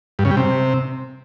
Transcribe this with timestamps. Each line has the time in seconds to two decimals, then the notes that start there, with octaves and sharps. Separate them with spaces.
0.19 G2
0.25 C#3
0.31 G3
0.37 C3